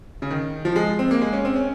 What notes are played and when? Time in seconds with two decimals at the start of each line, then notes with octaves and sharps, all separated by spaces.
0.22 C#3
0.31 D#3
0.65 F3
0.76 G#3
0.99 C4
1.11 A#3
1.22 G#3
1.33 C#4
1.45 C4
1.56 C#4